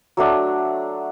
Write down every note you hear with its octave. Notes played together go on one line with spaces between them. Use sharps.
F#3 A3 D4